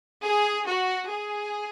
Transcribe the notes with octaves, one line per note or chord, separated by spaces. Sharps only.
G#4
F#4
G#4